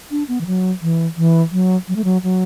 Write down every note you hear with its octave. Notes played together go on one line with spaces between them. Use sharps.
D4
B3
E3
F#3
E3
E3
F#3
F#3
A3
F#3
F#3